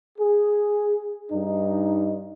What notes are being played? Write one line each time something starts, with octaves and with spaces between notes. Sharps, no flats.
G#4
G2 D#4